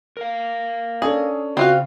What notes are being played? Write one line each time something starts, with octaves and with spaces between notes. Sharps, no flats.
A#4 F5
C#4 D4 G#4 A4
C#3 C4 F4 F#4 F5